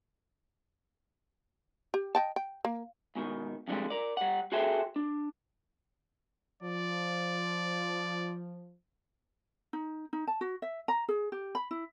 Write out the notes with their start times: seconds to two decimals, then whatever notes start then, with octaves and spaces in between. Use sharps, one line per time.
1.94 G4
2.15 D#5 G5 A5
2.36 G5
2.65 A#3
3.15 G#2 B2 D#3
3.68 F2 D3 G3 G#3
3.90 A#4 D5
4.17 G3 F#5
4.52 F#4 G#4 A4 C5 E5 G5
4.96 D4
6.63 F3 D5
9.73 D#4
10.13 D#4
10.27 A5
10.41 F#4
10.62 E5
10.88 A#5
11.09 G#4
11.32 G4
11.55 B5
11.71 E4